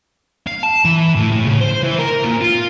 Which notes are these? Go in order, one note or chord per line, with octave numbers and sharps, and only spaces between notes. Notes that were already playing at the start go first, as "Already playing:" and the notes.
F5
A5
E3
A2
A2
C#3
C5
E3
A#4
A#2
F4